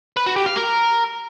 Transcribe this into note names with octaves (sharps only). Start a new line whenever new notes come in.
B4
F#4
G4
F5
A#4